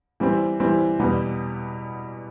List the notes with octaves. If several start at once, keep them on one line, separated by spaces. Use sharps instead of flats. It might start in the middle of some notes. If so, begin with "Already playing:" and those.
E3 G3 C4
E3 G3 C4
E2 B2 G3 B3